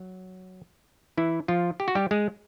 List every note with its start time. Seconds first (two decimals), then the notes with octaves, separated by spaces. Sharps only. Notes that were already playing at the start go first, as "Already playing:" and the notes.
Already playing: F#3
1.17 E3 E4
1.48 F3 F4
1.80 G4
1.88 F#4
1.95 G3 G4
2.11 G#3 G#4